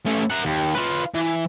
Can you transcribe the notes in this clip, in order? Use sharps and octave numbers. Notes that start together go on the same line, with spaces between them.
A3 C#4
A#4 F#5
D#2
F4 B4
E3